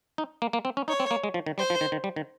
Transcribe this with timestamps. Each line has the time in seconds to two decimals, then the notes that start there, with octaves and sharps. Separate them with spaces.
0.18 D#4
0.42 A#3
0.53 A#3
0.65 C4
0.77 C#4
0.88 D#4 C#5
1.00 C4
1.11 A#3
1.24 G#3
1.34 F3
1.46 D#3
1.58 G3 C5
1.70 F3
1.81 D#3
1.92 D#3
2.04 G3
2.16 D#3